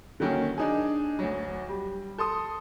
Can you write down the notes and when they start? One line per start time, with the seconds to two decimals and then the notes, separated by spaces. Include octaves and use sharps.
0.20 D3 D#3 F#3 A#3 C#4
0.58 D4 D#4 G#4
1.19 D2 F#3
1.69 G3
2.18 A4 C6 D#6